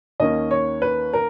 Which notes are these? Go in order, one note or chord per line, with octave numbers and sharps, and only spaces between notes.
D#2 D#3 A#3 C#4 D#5
C#5
B4
A#4